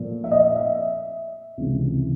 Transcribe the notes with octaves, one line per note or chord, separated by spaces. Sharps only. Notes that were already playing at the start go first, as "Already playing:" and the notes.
Already playing: A#2 F3 A3
E5
D#5
E5
C#2 C3 E3